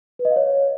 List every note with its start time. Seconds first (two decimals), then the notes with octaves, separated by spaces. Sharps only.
0.19 B4
0.25 D#5
0.31 F5
0.36 C#5